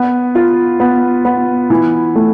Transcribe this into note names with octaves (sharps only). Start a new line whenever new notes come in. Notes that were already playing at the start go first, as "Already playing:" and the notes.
Already playing: B3
F4
B3
B3
E3
A3